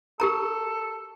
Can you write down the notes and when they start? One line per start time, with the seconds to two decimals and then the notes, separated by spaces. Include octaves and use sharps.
0.20 G4 A4 A#4 A#5